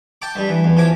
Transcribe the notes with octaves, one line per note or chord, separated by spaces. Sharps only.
G5 A5 D6
G2 G3
E3
E2
E3 F3 G#5 D6